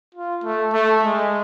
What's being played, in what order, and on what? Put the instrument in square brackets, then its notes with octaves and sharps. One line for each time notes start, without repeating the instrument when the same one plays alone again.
[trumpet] F4
A3
A3
G#3